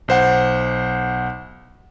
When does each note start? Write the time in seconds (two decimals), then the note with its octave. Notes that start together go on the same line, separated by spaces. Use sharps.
0.08 B1 C5 F#5